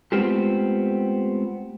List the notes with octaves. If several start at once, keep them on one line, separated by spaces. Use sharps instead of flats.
G#3 A3 B3 C4 F4 G4